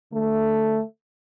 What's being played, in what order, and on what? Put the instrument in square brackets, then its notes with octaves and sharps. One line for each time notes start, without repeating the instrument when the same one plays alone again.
[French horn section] D3 A3